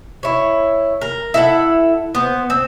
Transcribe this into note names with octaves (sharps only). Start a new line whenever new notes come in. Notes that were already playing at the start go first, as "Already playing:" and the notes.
E4 C#5
A#4
E4 A4 F#5
B3 C5
C4